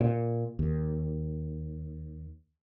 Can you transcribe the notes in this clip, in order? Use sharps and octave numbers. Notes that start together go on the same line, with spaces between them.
A#2
D#2